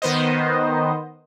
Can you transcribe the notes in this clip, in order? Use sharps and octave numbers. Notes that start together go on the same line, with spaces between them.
D#3 B3 C5 D#5